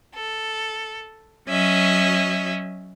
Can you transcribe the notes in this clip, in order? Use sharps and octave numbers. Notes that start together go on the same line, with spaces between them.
A4
F#3 C#4 D#5 E5